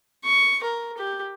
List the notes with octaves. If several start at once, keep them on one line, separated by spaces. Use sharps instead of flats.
C#6
A#4
G4